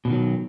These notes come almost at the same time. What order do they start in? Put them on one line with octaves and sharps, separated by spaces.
B2 E3 D#3 F#3